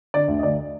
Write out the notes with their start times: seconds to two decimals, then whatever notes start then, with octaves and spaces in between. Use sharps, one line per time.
0.14 D3 D5
0.28 D2
0.39 D#5
0.43 D2 D5